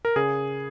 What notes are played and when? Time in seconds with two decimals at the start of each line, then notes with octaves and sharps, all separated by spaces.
0.05 A#4
0.16 C#3 G#4